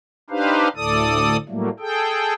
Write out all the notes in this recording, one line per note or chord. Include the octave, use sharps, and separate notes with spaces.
D4 D#4 G4 B4 C5 F5
D2 A2 A4 D5 D#6
A2 F#3 G3 A3 A#3
G#4 A4 G5